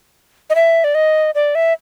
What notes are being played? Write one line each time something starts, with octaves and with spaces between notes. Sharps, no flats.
D#5
E5
D5
D#5
D5
E5